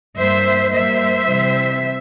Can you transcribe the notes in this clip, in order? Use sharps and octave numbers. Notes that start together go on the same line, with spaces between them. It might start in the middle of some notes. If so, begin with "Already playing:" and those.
G2 G3 A#3 C5 E5
G2 G3 A#3 C5 E5
C3 E3 G3